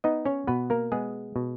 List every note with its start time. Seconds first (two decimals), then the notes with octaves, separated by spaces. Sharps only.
0.04 B3 D#4 D#5
0.26 C#4 C#5
0.47 B2 B3 B4
0.70 A#3 A#4
0.92 G#3 B3 G#4
1.36 B2